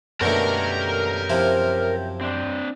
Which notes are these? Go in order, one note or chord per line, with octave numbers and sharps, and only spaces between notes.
F#2 B2 D3 A3 G4 A#4 C#5 A#5
C3 F3 E4
C4 D4